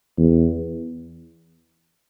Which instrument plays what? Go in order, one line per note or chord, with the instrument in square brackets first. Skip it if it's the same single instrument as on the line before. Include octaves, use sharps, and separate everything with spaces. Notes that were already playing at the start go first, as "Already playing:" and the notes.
[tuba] E2